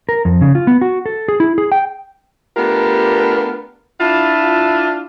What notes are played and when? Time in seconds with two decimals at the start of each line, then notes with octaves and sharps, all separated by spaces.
0.09 A#4
0.25 F2
0.41 C#3
0.55 F4
0.67 B3
0.81 F#4
1.06 A4
1.28 G#4
1.40 E4
1.58 G#4
1.72 G5
2.57 A3 B3 D4 F4 G4 A#4
4.01 D4 E4 F4